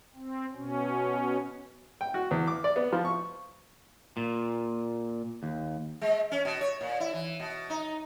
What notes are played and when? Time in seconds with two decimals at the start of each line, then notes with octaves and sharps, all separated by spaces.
0.14 C4
0.54 B2 C#4
2.01 G5
2.14 F#4
2.31 E2
2.47 D6
2.64 D5
2.76 B3
2.92 F3
3.05 C#6
4.17 A#2
5.43 D#2
6.01 G#3
6.32 C#4
6.45 B2
6.61 C#5
6.81 A#2
7.00 E4
7.13 E3
7.40 B2
7.70 D#4